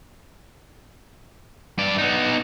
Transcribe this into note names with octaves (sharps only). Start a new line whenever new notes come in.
G2 D5
B3 D#4